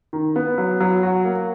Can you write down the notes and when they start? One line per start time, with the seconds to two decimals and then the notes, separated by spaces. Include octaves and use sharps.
0.13 D#3
0.36 B3
0.58 F#3
0.80 F#3
1.03 F#4
1.25 A#3